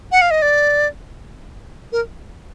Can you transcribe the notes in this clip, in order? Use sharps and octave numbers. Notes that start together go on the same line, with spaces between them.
F#5
F5
D#5
D5
A#4